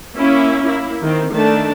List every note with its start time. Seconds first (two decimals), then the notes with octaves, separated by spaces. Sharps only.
0.14 A#3 C#4 E4
0.63 A#3 E4
1.02 D#3 C4
1.33 D#3 A3 D4 A5